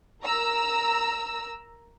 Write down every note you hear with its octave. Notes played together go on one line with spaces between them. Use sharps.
A#4 A#5 E6